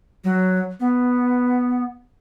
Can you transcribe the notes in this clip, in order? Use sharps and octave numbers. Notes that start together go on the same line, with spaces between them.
F#3
B3